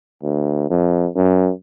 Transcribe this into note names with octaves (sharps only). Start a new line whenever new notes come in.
D2
F2
F#2